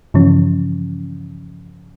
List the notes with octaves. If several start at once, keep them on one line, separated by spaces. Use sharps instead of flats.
G2 C#3 E3 F3 C#4